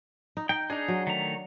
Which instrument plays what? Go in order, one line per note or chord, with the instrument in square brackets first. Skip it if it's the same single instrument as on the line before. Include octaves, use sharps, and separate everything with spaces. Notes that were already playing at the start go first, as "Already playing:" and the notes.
[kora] D#4
[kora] D#4 [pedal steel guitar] G5
[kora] D4 D#5 [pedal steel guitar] D#4 G#4
[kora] F#3
[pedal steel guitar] D#3 A3 A#5